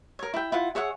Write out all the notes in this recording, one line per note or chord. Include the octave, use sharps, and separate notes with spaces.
A#4 C#5
E4 G5
E4 F4 F#5
G#4 C#5 E5 F#5